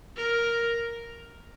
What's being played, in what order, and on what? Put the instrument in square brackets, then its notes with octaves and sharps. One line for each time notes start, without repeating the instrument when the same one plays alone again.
[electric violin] A#4